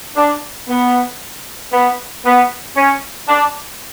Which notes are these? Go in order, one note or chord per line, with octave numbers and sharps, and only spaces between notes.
D4
B3
B3
B3
C#4
D4